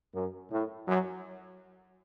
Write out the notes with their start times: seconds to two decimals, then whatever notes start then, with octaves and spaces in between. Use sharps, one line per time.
0.14 F#2
0.51 A2
0.87 F#2